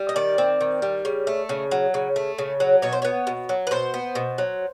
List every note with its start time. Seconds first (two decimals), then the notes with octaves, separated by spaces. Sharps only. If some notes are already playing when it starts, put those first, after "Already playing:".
Already playing: G3
0.09 D#5
0.16 D#3 D5
0.38 C4
0.61 D#3
0.82 G3
1.05 C#3
1.27 A3
1.49 C#3
1.71 F#3
1.94 C#3
2.16 A3
2.38 C#3
2.60 F#3
2.82 B2 C#5
2.93 C5
3.02 B3 C#5
3.27 B2
3.49 F#3
3.67 B4
3.71 B2 C5
3.94 B3
4.15 B2
4.38 F#3